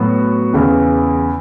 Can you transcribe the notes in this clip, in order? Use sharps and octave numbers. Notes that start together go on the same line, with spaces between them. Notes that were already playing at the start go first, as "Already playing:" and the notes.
Already playing: A2 F#3 B3 F#4
E2 C#3 E3